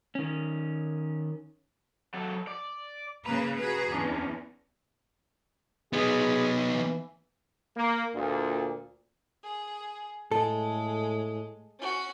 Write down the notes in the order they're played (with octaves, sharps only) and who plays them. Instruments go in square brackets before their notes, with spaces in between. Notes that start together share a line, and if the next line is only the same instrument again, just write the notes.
[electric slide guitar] D#3 C#4
[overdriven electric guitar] F#3 A4
D5
[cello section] C#3 A#3 B4 [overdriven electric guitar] A#5
[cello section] F#4 G#4 B4
[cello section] E2 [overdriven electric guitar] C#4 D4
[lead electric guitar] B3 D#4 [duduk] G#4
[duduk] E3
[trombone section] A#3
D2 A#2
[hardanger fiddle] G#4
[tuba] A2 [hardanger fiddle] G#3 [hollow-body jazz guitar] A4
[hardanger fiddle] C#4 F#4